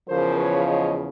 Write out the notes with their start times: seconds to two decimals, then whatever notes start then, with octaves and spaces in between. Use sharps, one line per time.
0.09 E2 C#3 F3 A#4 C5
0.37 B4 C#5
0.65 C#5 D#5